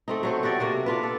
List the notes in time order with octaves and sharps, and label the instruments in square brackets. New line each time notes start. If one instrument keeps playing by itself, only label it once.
[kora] A3 C4 D#4
F#3 A3 C5
B3 F#4 G4 D5
C3 A#3 F#4
D4 F4 B4
A4